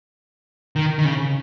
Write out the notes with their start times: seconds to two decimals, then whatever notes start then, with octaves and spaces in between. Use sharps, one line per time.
0.76 D#3
0.99 D#3
1.05 C#3